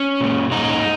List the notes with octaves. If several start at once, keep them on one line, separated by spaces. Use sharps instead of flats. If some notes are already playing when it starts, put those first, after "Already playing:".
Already playing: C#4
A#2 G#3
A#2 G#3 D#4